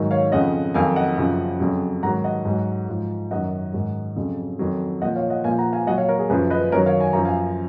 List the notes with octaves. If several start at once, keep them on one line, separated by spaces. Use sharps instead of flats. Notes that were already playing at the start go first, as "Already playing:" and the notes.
Already playing: G#2 D#3 F#3
C#5 F5
F2 C#3 F3 D#5 F#5
F2 D#3 F#3 F5 G#5
D#5 F#5
F#2 C#3 F3
F2 C#3 F#3
G#2 D#3 F#3 F#5 A#5
D#5 F#5
G#2 F#3
G#2 F3
F#2 D#3 F#3 D#5 F#5
G#2 D#3 F#3
F2 C#3 F#3
F2 D#3 F#3
A#2 F3 D#5 F#5
C#5 F5
D#5 F#5
A#2 F3 F5 G#5
F#5 A#5
F5 G#5
A#2 F#3 D#5 F#5
C#5 F5
A#4 C#5
G#4
F#2 C#3 F3 G#4 B4
B4 D#5
F#2 D#3 F#3 A#4 C#5
C#5 F5
G#5
F#2 F3 A#5
F5 G#5